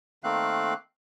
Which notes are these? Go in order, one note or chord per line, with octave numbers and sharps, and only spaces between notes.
D#3 A3 A#3 C4 F5 F#6